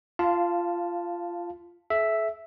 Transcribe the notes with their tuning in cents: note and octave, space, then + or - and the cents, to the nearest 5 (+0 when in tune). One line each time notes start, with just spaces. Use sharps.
F4 -15 F5 +0 A5 +0
A4 -45 E5 +0